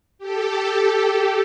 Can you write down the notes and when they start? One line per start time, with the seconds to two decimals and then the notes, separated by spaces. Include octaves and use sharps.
0.19 G4 A4